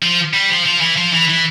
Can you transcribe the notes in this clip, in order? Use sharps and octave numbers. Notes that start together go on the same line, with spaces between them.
F3
G3
F3
F3
E3
F3
E3
E3